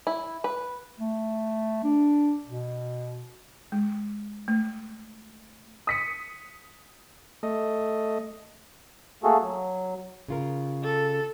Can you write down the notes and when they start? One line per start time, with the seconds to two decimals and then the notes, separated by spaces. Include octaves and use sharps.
0.07 E4
0.44 B4
1.00 A3
1.84 D4
2.47 B2
3.72 G#3
4.48 A3
5.87 D#6 B6 C#7
7.43 A3 D#5
9.24 A3 A#3 F#4 G#4 A4
9.43 F#3
10.28 C#3 F4 A#4
10.84 A4